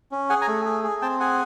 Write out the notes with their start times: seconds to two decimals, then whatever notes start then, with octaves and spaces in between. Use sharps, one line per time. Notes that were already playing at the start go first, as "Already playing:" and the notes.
0.12 C#4
0.29 G#4 F#5 G#5
0.41 G#5 A#5
0.48 A3
0.65 G#4
0.84 G#4
1.02 C4 G5 A5
1.20 G#4 F#5 G#5